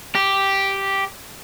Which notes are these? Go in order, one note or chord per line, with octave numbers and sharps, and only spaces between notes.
G4